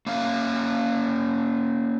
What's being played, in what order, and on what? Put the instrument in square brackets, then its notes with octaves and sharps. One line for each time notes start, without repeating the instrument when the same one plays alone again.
[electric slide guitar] A#3 C#4 F5